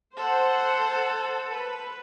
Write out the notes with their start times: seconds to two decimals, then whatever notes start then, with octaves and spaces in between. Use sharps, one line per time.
0.16 A4 C5 F#5
1.49 B4